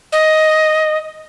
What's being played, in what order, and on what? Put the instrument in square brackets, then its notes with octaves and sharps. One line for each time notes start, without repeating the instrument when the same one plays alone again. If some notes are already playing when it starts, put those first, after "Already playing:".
[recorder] D#5